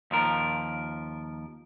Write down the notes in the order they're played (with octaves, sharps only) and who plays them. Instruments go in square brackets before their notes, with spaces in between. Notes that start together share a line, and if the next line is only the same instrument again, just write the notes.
[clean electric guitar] D#2 F3 A#4